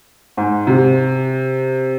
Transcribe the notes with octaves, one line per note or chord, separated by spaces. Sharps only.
G#2
C3